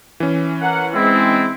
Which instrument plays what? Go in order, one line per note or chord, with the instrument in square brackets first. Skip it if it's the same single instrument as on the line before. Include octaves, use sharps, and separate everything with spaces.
[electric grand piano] E3 C#4
[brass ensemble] A#4 F#5
[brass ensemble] G#3 C4 [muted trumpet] E4